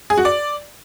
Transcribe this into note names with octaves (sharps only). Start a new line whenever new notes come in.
G#4
F#4
D5